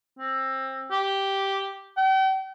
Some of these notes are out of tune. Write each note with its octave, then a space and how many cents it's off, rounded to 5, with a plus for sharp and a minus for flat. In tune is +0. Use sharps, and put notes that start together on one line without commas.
C4 +25
G4 -5
G5 -40